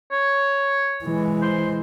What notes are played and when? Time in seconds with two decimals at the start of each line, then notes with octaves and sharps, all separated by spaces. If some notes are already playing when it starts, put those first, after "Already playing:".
0.11 C#5
1.04 E3 G#3
1.41 C5